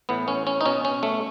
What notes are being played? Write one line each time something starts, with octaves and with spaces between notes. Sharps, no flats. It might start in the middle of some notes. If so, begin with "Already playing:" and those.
A2 E3 B3
C#4
C#4
D#4
B2 C#4
C#4
A3